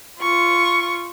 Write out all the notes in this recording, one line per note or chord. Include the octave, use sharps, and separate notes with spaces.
F4 C#6